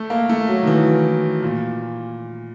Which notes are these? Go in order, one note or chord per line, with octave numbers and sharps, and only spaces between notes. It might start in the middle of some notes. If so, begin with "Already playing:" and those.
Already playing: A3
A#3
A3
F#3
D#3
E3
A#2